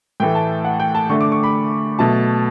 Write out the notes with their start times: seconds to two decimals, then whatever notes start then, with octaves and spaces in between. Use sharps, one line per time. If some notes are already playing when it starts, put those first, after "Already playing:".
0.20 A2 E3 A3 G5
0.35 A5
0.65 F#5
0.80 G5
0.95 A5
1.09 D3 A3 C#6
1.21 D6
1.32 C#6
1.43 B5
1.99 B2 F#3 A3 A5